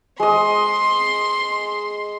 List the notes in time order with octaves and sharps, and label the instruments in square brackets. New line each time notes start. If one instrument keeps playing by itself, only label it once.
[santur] G#3 D#5 [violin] C6